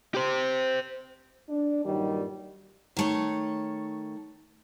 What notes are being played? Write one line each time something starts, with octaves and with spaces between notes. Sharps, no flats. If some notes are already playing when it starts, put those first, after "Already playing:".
G4 C5
D4
G2 A#2 D#3 F#3 G3
D#3 A3 C#5